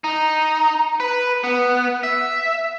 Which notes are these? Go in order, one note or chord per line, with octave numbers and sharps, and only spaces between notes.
D#4
B4
B3
E5